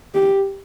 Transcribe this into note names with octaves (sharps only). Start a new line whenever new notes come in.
G4